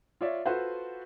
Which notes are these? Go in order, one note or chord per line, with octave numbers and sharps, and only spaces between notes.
F4 C#5 D5 E5
F4 F#4 A4 B4 C5